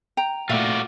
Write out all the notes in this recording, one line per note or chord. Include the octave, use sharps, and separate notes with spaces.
G5 A#5
A#2 A3 F4 F#4 D5 E5